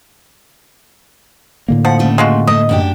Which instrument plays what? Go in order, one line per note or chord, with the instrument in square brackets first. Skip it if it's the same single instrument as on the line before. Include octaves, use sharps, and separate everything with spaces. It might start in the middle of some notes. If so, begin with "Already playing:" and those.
[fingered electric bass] A2 D3 A#3
[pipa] F3 [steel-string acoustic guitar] F#5
[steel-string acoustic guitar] C#3 G3 A3
[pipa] G#3 F4 F#4
[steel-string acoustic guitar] A3 [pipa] D#5
[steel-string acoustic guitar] F#2 D4 G4